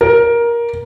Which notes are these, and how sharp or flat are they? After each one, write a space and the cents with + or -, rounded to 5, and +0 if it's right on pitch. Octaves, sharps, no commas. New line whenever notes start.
A#4 +15